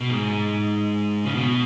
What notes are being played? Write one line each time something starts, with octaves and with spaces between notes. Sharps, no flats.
B2
G#2
C#3
B2